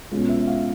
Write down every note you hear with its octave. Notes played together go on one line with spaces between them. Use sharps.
B2 G#3 C#4 F4
E5
F5